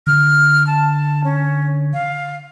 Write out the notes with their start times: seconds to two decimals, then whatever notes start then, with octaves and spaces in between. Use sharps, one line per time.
0.07 D3 F6
0.67 A5
1.24 C#4
1.93 F5